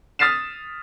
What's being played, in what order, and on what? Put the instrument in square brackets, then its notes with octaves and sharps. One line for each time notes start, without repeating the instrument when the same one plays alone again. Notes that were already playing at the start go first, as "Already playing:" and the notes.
[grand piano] D#6 F6 A6 B6 C7 E7